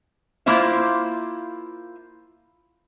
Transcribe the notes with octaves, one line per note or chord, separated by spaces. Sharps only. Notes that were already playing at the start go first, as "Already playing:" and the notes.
A#3 E4 F4 C5 E5